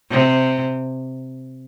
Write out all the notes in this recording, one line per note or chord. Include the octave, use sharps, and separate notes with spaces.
C3